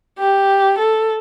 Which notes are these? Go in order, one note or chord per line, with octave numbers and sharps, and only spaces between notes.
G4
A4